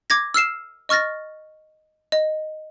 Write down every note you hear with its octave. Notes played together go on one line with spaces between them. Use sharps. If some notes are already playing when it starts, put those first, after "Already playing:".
D6 G#6 A#6
E6 F6 C7 E7
D#5 C#6 F6 A6 A#6
D#5